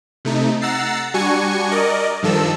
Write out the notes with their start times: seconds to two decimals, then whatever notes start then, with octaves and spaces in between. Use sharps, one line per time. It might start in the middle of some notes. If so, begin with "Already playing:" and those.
0.25 C3 A3 D#4
0.62 F#5 A#5 E6 A6 C7
1.14 G3 D4 F#4 G#5 C#6 C#7
1.71 A#4 D5 D#5
2.23 G2 D#3 F3 A4 E6